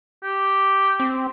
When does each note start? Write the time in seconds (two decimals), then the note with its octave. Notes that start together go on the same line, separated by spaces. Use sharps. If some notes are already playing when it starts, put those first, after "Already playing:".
0.24 G4
1.00 C4